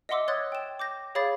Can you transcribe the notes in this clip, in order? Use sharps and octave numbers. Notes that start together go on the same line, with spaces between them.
D#5 E5 F#5 C6 D6 E6
C#5 C6 D#6 F#6 G#6 A6
G5 E7
D6 G6 A#6
G#4 C#5 F5 B5 D6 A6